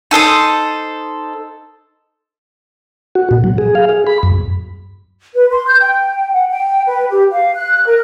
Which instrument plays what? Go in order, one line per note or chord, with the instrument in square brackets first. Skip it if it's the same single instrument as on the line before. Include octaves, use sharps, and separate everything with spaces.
[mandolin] D#4 A4 C5 D#6
[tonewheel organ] F#4
A#2
F#3
G#4
F5
G#4
B5
F#2
[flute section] B4
C6
G6
G5
F#5
G5
B4
G4
F5
F#6
A#4